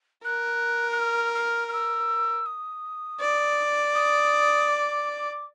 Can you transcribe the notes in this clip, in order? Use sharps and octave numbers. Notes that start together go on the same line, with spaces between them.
A#4 F#6
F#6
F6
F6
F6
E6
D#6
D5
D#6
D6